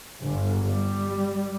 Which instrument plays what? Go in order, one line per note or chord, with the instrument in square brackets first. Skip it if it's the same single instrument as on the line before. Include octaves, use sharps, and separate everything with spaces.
[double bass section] G1
G3